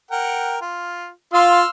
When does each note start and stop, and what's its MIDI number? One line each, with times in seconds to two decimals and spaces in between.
0.11 0.57 70
0.11 0.57 78
0.11 0.57 79
0.62 1.09 65
1.33 1.62 65
1.33 1.69 77
1.33 1.69 84
1.33 1.69 88